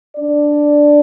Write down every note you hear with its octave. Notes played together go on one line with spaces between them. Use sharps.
D4 D5